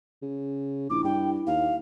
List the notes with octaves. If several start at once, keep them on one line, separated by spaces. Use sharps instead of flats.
C#3
A#1 E4 D6
G2 G5
D#2 F5